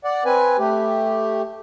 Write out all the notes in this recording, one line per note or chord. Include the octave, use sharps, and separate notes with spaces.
D5 F#5
C4 B4 G#5
A3 G4